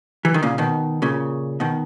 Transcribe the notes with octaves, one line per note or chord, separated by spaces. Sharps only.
E3
D#3
A#2 C#3
B2 D#3
A#2 C#3
B2 D#3